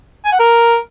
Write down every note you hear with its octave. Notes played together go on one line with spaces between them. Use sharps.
G#5
F#5
A#4